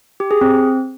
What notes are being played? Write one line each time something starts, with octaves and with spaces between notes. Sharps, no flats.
G4
G#4
C4